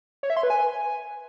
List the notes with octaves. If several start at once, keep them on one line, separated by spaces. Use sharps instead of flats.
C#5
E5
C6
B4
G#5